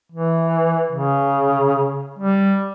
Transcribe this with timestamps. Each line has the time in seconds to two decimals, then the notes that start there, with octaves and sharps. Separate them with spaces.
0.12 E3
0.91 C#3
2.19 G3